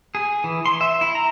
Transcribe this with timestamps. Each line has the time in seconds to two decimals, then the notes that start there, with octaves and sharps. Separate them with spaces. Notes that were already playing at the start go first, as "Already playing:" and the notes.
0.15 G#4
0.44 E3
0.66 C6
0.81 E5
1.01 E4
1.15 A#5